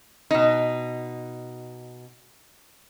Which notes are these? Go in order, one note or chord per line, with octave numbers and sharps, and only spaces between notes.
B2 D#4